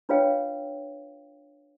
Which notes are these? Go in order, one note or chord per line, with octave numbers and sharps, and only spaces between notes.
D4 F4 B4 C#5 F5 G5